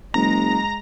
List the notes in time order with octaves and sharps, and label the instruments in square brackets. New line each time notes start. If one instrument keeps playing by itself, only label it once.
[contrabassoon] F#1 [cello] G#3 [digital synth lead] A#5